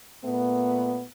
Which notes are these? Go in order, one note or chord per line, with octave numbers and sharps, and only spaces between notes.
A#2 A3 B3